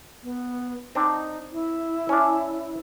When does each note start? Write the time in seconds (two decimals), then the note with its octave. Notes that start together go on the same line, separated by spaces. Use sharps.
0.23 B3
0.95 C4 D4 D#4
1.52 E4
2.09 C#4 D4